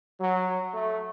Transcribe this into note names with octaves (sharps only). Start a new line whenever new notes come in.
F#3
A3